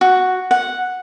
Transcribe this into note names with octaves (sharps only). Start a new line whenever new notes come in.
F#4
F#5